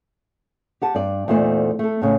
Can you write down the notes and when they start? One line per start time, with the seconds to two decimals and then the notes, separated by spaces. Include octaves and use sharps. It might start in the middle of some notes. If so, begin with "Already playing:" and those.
0.82 G4 F#5 A5
0.95 G2 D5
1.28 E2 A#2 A3 D#4 C5 D5
1.79 A3 A4
2.02 A2 C#3